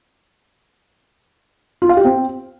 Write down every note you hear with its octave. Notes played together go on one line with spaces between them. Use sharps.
F4
F5
G4
C4